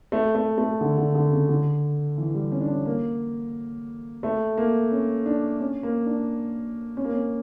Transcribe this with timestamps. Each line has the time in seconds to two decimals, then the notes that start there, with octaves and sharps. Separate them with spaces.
0.12 A3
0.35 A3
0.58 A3
0.81 D3
0.98 D3
1.15 D3
1.32 C#3
1.49 D3
2.18 E3
2.34 G3
2.52 C#4
2.61 D4
2.69 C#4
2.86 A#3
4.23 A3
4.58 A#3
4.92 C#4
5.26 D4
5.60 C#4
5.83 A#3
6.06 D4
6.97 C#4
7.05 A#3
7.12 C#4